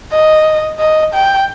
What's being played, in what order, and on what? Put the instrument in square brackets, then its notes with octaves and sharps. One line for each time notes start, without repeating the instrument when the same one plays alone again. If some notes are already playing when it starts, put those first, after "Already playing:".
[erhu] D#5
D#5
G5